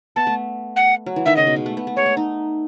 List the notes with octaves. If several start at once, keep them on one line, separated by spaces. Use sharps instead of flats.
B3 A5
A3
F#5
F#3
E3
D#3 E5
C#3 D#5
B2
G#3
A3
B3
A3
G#3 C#5
A3
D#4